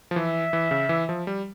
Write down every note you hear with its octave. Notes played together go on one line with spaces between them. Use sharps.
F3
E3 E5
E3
C#3
E3
F3
G3